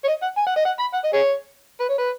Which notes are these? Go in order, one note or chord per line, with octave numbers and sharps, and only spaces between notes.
C#5
D#5
F#5
G#5
F#5
D#5
F#5
B5
F#5
D#5
G#4 C#5
B4
C#5
B4